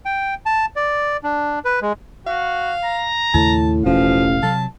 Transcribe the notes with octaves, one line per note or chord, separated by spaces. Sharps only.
G5
A5
D5
D4
B4
G#3
F#4 F5
A#5
D#2 A2 C#3 A5
E1 A1 F3 F5
C3 F#3 A5